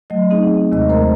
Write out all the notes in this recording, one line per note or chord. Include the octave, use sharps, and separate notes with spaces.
F#3 A3 D#5
C4 D#4 G#4
D#2 C3 G#3 D#5
A3 A#4 C5 A#5